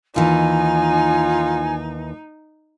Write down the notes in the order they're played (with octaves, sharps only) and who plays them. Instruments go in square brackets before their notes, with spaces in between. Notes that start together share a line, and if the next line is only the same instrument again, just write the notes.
[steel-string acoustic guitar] D#2 E3 [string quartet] D#4 [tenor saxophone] F4 [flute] G#5